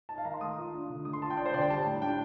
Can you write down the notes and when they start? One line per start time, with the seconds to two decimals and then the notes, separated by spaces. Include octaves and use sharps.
0.09 D#4 A5
0.18 F5
0.25 D#3 A#5
0.34 C6
0.41 A3 D#6
0.57 F4
0.74 D4
0.90 D3
1.05 A3 D#6
1.13 C6
1.22 F4 A5
1.30 G5
1.37 D4 D5
1.46 C5
1.54 D3 D5
1.61 G5
1.70 G3 A5
1.86 A2
2.02 D4 G5